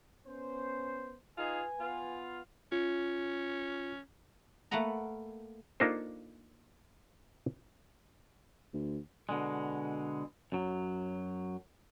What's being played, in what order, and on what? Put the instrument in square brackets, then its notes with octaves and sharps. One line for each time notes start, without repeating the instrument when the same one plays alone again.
[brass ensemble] B3 C#4 C5
[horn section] D#4 F4 G#4 [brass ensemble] B4 G#5
[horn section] B3 F4
[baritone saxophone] C#4 [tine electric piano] F4
[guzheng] A3 A#3 B4 F#5 A#5
[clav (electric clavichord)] A#3 D4 D#4 F4 A4 C5
[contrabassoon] D2
[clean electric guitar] B2 D3 G#3
F#2 F#3